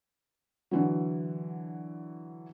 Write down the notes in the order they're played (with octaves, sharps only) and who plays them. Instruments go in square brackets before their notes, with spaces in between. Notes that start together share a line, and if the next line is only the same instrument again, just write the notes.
[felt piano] D3 E3 F#3